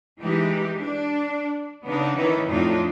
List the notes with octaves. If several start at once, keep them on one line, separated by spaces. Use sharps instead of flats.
E3 G#3 D#4 G4
D4
C#3 B3 D4 D#4
D#3 E3 C#4 D#4
F2 A2 D4 D#4 F4